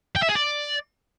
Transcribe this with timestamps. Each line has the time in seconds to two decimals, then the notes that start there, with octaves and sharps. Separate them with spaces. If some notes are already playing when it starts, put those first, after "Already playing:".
0.16 G5
0.23 E5
0.29 G#4
0.36 D5